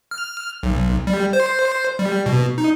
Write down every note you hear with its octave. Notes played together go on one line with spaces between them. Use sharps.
F6
B1
G3
C5
G3
B2
D#4